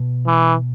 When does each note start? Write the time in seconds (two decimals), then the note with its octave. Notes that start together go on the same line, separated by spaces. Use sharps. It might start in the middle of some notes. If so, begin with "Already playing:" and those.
Already playing: B2
0.26 E3